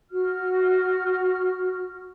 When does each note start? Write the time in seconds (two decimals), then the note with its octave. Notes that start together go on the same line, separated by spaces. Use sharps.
0.11 F#4 F6